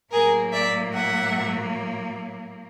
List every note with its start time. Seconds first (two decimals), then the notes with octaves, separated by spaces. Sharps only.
0.12 A2 F#3 A#3 G#4 A#4
0.52 D5 E5
0.94 E5 F#5